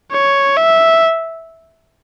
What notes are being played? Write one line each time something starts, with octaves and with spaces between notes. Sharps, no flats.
C#5
E5